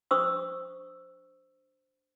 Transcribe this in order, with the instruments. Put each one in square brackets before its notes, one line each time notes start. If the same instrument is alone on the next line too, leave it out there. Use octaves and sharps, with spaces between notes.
[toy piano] D4 C5 C#6 D#6 E6